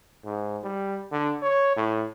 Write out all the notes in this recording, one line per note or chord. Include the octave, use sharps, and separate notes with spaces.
G#2
G3
D3
C#5
A2